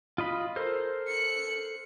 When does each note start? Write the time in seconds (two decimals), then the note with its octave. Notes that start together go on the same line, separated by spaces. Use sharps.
0.18 F4 D#5 B5
0.56 A4 A#4 C5
1.07 F#6 C#7